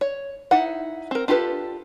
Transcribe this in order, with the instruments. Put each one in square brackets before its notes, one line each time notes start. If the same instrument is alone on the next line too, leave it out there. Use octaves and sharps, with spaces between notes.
[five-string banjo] C#5
D#4 E4 F#5
C4 A#4
D4 F4 G4 A4 B4